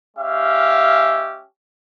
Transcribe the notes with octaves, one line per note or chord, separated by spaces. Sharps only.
G#3 C#4 G4 E5 F5